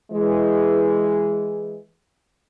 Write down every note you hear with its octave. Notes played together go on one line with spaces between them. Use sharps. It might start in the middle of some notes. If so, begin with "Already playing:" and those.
E3 G#3